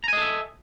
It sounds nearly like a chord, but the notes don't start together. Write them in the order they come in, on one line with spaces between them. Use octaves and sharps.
A#5 G#5 D#5 A4 E5